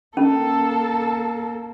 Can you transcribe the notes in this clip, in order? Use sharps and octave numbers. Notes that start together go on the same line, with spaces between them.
A#3 C#4 A4